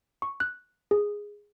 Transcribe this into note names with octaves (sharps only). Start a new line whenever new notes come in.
C#6
F#6
G#4